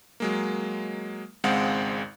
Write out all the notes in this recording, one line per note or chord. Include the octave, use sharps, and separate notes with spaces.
F#3 G#3 A#3
G#1 C#2 G#3 C4 F5 F#5